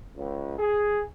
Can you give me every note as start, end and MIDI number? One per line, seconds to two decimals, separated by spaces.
0.16 0.58 37
0.59 1.01 68